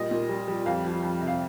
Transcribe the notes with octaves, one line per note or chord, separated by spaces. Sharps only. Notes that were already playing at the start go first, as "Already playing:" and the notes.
Already playing: A#2 G3 D#5
A#2
G3
G3
F2 F5
F3
F2
C3
F5